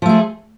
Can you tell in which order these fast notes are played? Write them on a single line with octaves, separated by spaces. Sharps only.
F3 A3 G#4